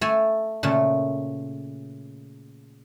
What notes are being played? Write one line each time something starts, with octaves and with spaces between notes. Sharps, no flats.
A3 A4 G#5
A#2 C#3 A3